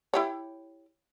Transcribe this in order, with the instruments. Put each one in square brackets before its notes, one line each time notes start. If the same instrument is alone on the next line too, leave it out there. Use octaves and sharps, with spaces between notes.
[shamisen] E4 G4 C#5